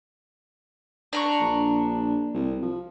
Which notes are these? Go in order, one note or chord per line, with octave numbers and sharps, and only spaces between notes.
D4 A#5 C#6
A#1
C2
F3